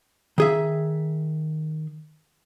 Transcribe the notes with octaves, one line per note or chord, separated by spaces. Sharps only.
D#3 G#4 E5